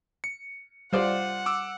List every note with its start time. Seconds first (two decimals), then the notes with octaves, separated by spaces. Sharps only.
0.24 C#7
0.93 G3 F4 C5 D5 F#5
1.46 D6 E6